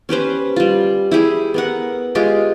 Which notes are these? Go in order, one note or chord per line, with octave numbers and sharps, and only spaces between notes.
C#4 G4 B4 C5
G3 F4
E4 G4 G#4
B3 A#4 F#5
G#3 F4 G4